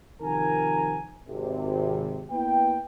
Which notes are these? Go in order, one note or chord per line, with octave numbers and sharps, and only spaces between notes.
C3 D#3 F3 A#4 G#5 A#5
G#1 C3
A#3 B3 E4 B4 G5